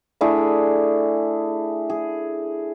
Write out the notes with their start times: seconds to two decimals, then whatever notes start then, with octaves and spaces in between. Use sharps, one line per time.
0.21 A3 D4 E4 G#4
1.90 G#4